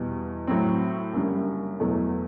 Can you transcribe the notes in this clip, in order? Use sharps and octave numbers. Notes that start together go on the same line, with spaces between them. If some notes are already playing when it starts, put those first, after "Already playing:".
Already playing: E2 B2 G3
A2 F#3 C4
F#1 F#2 D3 G3
E2 B2 F#3 A3 E4